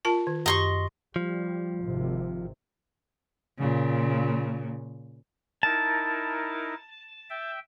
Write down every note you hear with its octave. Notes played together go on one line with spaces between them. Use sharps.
F4 A#4 A5
D#3
F#2 G4 D#5 C6 C#6
F3 G3
G#1 C3
A#2 C#3
D#4 E4 A#4 A5
E5 G5